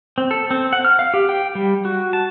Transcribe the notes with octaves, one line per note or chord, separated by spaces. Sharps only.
C4
A4
C4
F#5
F6
F5
G4
G5
G3
F#4
A5